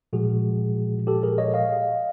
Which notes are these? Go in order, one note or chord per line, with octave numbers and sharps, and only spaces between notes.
A#2 F3 G#3 F#4 G#4
G4 A4
G#4 A#4
C#5 D#5
D#5 F5